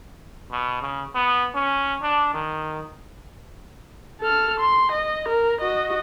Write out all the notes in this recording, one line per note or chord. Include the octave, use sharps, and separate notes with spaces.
B2
C#3
B3
C#4
D4
D#3
A4 F6
C6
D#5
A#4
F#4 D#5